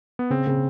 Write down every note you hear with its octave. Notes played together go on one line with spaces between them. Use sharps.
B3
C#3 C4
C#3